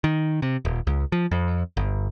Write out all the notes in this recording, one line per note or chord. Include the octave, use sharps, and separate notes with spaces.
D#3
C3
D#1
C#2
F3
F2
G1